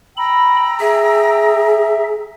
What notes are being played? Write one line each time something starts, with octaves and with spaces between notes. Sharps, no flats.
G5 A#5 B5 E6
G#4 E5